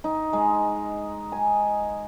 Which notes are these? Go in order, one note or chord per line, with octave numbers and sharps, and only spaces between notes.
D#4
G#3
G#5